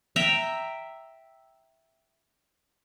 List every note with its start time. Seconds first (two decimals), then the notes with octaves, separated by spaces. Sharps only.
0.16 E5 G5 A#5